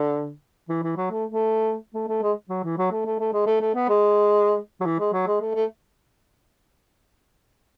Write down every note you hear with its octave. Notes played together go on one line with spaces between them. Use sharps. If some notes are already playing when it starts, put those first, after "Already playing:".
Already playing: D3
E3
E3
F#3
A3
A3
A3
A3
G#3
F#3
E3
F#3
A3
A3
A3
G#3
A3
A3
B3
G#3
F#3
E3
G#3
F#3
G#3
A3
A3